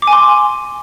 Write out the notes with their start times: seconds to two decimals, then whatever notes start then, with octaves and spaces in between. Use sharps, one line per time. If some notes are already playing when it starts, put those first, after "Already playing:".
0.02 D6
0.07 G#5
0.13 C6